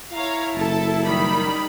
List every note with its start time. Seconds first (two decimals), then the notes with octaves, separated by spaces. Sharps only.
0.12 E4 C#5 F5 A#5
0.55 F#1 A4 A5
1.04 D#3 G3 B5